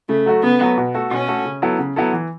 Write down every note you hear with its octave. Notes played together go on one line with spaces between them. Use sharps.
C#3 A3
F#3 A3 F#4
C#3 B3
F#3 A3 F#4
B2
A3 F#4 A4
B2 C#4
A3 F#4 A4
C#3
F#3 B3 E4 A4
C#3
F#3 B3 E4 A4
E3